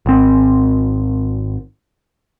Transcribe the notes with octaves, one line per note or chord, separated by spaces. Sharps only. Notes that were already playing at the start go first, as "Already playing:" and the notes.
G#1 C4